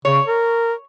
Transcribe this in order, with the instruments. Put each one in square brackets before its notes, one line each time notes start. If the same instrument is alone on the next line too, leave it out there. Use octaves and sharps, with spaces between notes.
[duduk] C#3 [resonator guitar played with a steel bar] C#5
[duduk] A#4